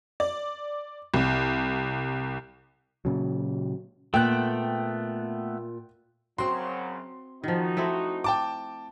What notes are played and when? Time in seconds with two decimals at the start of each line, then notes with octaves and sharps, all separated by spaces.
0.20 D5
1.14 C2
3.05 A#2 C#3 F#3
4.14 A#2 A3 B3 G5 F#6
6.38 F#2 C#3 F#3 C4 F#4 C6
7.44 D#3 F3 D#4 F#4
7.77 A3 C4 E4
8.24 G5 A5 D6